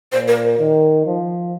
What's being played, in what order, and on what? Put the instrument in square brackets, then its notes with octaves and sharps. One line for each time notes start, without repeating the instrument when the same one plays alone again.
[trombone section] A#2 [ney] C5
[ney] A#4
[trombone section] D#3
F3